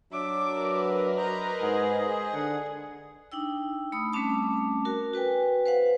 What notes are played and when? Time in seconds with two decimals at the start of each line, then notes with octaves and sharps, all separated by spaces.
0.12 F#3 D4 E5 D6
0.55 A#4 B4
1.17 C5 D#5 A#5
1.62 G#2 G#4
2.34 D3 F#5
3.32 D4 D#4 G5 E6
3.92 A3 B5 D#6 E6
4.13 G3 A3 C4 C#4 A5 D6
4.85 F#4 A#4
5.13 F#4 B4 G5 G#5
5.65 B4 C5 F5 F#5